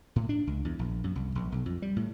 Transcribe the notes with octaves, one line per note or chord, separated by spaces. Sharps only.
A2
D4
C#2
E2
A#1
F#2
C2
A#1
B1
F2
G3
A2